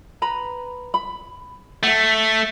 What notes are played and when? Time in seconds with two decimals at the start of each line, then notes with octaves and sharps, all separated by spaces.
0.22 B4 A#5 B5
0.94 B5
1.83 A3 F#5 A5